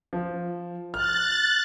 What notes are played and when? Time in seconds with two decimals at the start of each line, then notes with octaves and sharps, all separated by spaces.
0.13 F3
0.94 F6 F#6 A6